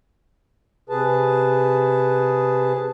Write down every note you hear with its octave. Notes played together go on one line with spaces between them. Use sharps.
C3 G#4 B4 A5